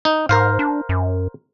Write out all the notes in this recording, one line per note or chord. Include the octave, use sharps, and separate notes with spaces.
D#4
G#2 A#4 C5 F5
D4
F#2